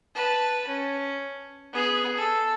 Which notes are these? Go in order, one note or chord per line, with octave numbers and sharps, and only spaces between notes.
B4 A5
C#4
B3 G#4
A4